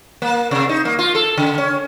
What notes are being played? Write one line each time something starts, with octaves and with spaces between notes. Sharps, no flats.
A#3
C3
D#4
A#3
F4
A4
C#3
C#4